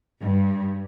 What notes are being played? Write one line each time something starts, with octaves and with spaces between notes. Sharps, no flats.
G2